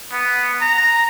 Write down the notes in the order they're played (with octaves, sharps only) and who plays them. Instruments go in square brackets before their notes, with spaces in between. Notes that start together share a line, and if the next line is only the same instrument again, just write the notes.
[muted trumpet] B3
A#5